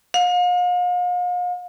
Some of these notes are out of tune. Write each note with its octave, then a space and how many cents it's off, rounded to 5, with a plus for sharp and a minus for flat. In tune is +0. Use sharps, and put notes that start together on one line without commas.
F5 +40